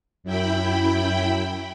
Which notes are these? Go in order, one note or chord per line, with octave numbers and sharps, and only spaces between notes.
F#2 E4 G5 B5